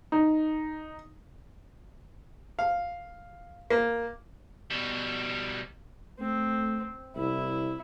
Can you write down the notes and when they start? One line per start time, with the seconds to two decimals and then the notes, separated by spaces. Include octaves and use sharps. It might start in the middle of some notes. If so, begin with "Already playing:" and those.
0.12 D#4
2.59 F5
3.70 A#3
4.70 B2 G3
6.20 A3 C4
7.17 C2 E4